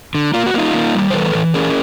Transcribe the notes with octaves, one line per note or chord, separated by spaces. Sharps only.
D3
A#3 F4
F#4
A#3 D#4 F4
A#3
G3
C5
E3 A4 B4
E3
C#4 G#4 A#4